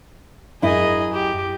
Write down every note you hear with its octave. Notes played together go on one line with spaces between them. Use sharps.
F#2 E4 G#4 D#5
G4